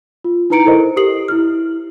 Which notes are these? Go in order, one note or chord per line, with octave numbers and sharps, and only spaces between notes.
F4
D#4 E4 B4 A#5 C#7 D7
E4 A4 A#4 C5 D#5
G4 A#4 D#6 C7 F#7
E4 F6